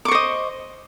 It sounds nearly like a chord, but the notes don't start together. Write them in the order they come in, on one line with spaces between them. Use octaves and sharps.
D6 C#6 C5 D#5